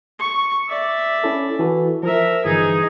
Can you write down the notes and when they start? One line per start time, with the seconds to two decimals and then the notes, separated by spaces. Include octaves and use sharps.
0.19 C#6
0.68 D5 E5
1.24 C#4 E4 A4
1.59 E3 F#4 A4
2.03 F3 A#4 E5
2.45 G1 E3 D#4 G#4 G#6